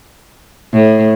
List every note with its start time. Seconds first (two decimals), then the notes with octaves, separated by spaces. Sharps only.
0.73 A2